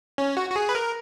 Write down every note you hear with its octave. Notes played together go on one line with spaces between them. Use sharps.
C#4
F#4
F#4
G#4
B4
A#4